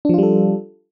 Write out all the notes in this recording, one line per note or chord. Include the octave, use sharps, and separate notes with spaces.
F3 G3 D4 F4 A4